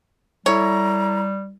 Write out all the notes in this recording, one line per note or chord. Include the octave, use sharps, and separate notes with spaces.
G3 E4 A4 C#5 A#5